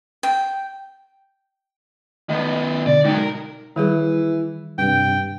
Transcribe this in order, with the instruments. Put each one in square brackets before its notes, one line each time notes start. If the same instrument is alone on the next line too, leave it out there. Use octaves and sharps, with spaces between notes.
[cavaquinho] G5
[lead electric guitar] D#3 B3 [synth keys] D#5
[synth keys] B2 D3 [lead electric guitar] D5
[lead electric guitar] G#2 F#3 [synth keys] D#4 G5
[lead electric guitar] A#4
[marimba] D#3 G3 G#4 [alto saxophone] E3 [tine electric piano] E4
[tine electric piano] G2 C3 [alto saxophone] G5